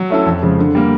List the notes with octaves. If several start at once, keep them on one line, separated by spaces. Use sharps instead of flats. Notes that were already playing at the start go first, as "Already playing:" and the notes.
Already playing: F#3
A3 C#4 E4 A4
F2
C#3 F3 G#3
D3
G3 A#3